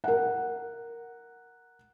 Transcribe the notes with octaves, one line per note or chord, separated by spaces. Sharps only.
A#4 F#5